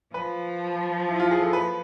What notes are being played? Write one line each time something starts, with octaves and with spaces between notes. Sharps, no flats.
F3 B4
E4
F4
G#4
A4
B4